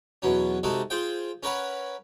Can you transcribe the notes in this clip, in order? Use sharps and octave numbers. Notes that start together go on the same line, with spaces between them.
E2 B2 F#3 C#4
C3 G#3 D#4 F#4 A4
F4 G#4 C5 G5
C#4 A#4 B4 C#5 F#5 B5